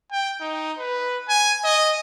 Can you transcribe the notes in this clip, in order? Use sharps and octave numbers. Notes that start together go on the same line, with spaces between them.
G5
D#4
B4
G#5
D#5